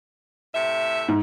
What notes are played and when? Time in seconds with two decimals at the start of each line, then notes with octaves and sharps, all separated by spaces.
0.55 A2 C3 E5
1.08 G#2